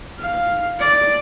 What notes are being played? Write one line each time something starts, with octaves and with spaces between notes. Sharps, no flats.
F5
D5